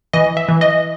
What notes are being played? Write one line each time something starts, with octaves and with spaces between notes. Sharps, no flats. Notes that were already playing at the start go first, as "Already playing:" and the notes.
E3 D#5
E5
E3
D#5